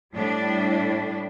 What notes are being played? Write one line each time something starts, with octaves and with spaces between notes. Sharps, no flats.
A2 G3 D4